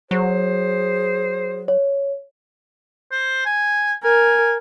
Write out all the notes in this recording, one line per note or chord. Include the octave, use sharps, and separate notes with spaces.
F#3 G#4 C5
C#5
C5
G#5
A#4 G#5